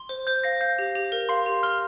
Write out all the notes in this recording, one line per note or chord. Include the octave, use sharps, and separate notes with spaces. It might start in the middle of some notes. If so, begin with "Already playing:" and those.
Already playing: C6
C5
C5 G6
F5 A#6
F5 G6
G4
G4
A#4
F5 C6
G4
C6 F6